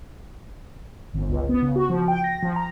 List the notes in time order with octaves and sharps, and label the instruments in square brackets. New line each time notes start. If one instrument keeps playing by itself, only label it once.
[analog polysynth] G1
C#2
B3
C#3
F#4
F3
G5
A#6
F3
A#5